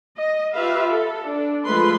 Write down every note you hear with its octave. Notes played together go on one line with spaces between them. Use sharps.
D#5
F4 G4 B4 E5 F5
A4
D4
F3 G#3 A3 B4 B5 C6